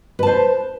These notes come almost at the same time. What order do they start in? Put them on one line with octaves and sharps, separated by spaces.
B4 A5 C5